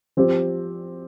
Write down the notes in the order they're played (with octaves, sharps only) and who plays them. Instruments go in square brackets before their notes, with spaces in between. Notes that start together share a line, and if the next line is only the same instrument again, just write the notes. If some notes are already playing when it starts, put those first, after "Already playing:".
[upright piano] F3 C4 G4 C5